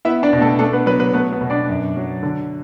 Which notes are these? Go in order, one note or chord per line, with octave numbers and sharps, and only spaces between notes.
B3 E4 E5
D4 D5
B2
A3 A4
A3 D4 A4
B3 B4
F#3 B3 B4
B3 B4
A3 B3 B4
B3 B4
B2
D4 D5
F#2
F#3
D3